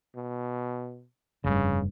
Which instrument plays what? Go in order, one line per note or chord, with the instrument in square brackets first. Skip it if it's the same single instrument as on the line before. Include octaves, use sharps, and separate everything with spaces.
[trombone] B2
[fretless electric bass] F1 G2 [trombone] C#3